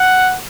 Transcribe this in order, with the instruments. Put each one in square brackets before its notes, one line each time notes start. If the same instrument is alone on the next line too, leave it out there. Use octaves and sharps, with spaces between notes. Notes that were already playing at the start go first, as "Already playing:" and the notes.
Already playing: [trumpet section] F#5